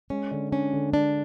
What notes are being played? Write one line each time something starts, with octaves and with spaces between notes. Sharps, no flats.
G#3 C#4
D3
C#4 D4
D3
G#3 D4